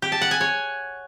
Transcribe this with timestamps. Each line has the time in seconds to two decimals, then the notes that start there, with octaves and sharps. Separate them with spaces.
0.02 G4
0.12 A5
0.22 F#5
0.31 G#5
0.41 C#5